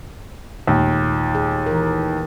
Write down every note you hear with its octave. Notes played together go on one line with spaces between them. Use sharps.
D#2 A#2 G#3 A3
G#4
E3 A#4